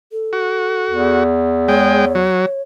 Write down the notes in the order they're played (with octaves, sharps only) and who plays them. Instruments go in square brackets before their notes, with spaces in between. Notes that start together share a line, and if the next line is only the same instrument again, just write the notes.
[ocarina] A4
[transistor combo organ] F#4
[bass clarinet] E2
[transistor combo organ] G#3 G5 [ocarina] C#5
[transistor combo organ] F#3